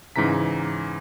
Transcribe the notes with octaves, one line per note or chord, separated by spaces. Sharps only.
G#2 C#3 E3 A#5 B6